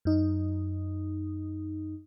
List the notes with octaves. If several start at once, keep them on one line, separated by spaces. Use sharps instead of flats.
F#2 D#4